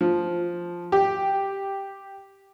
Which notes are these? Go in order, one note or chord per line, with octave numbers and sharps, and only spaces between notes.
F3
G4